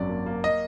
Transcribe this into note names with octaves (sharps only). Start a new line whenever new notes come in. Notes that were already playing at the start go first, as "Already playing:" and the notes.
Already playing: G#1 F#2 F#3 D5
A#3
A#3
D#5